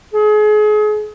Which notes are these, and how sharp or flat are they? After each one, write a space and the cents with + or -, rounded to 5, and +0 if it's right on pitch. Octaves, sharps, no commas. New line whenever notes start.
G#4 +35